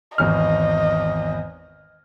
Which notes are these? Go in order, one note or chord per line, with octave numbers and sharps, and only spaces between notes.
G#1 E2 D#5 F6